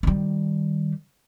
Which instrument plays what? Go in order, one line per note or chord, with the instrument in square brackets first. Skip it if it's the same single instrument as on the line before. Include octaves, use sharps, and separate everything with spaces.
[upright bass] D#3 G3